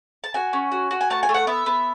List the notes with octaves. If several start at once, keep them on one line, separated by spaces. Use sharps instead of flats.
A5
F#4 G#5
C#4
F#4
F#4
G#5
A3 A5
G#5
A3
F#5
B3 E5
B3